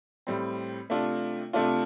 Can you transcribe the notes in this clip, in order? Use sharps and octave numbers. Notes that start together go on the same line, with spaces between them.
A2 G3 C4
C3 A3 D4 F4
C3 A3 D4 F4